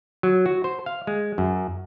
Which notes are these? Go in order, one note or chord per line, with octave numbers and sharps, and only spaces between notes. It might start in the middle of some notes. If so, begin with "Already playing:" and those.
F#3
F#4
C5
F5
G#3
F#2